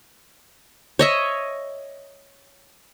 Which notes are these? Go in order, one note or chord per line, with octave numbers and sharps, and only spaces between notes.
C#5 D#5 E5